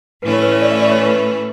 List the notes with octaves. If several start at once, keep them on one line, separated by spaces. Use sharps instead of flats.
A2 E3 A3 C#4 E4 B4
C#5
B4
C#5
D5
E5
D5
C#5
B4